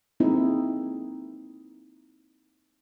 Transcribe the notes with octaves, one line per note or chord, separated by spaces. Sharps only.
G#3 A#3 C4 D#4 E4